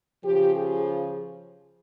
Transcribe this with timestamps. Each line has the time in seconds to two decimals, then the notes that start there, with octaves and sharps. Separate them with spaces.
0.23 C#3 F3 G4
0.53 G#4